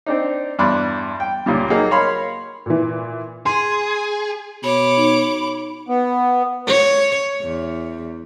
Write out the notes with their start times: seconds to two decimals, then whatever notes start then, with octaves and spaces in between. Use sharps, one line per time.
0.06 C4 D4 D#4
0.59 E2 G2 D5 B5 C6 F#6
1.20 G5
1.46 C#2 A#2 G3
1.70 F#3 A#3 D#4 G#4
1.91 A#4 C#5 F5 B5 C6
2.66 A#2 E3
3.46 G#4 C6
4.63 B2 C#5 B5 D6
4.97 D#4
5.89 B3
6.67 C#5
7.42 E2